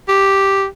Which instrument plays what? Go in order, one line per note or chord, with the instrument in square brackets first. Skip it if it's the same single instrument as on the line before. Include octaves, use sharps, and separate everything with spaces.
[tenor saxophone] G4